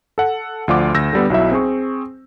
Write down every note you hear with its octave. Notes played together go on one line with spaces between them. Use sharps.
A4 F#5
D2 F3 F4 D5 F#5 D6
D2 E6 G6 A#6
D3 G3 B3
B1 F#3 E4 E5
C4 G#4 C#6